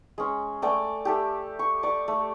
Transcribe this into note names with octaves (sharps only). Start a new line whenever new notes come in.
G#3 C#4
A3 D5 G5 G#5
G4 A4 E5
C#6
D5 C#6
A3